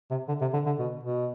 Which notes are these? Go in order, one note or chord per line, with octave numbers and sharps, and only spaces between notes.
C3
D3
C3
D3
D3
B2
B2